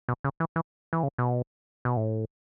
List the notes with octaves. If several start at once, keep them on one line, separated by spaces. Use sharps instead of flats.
B2
C#3
E3
E3
E3
C#3
B2
B2
A2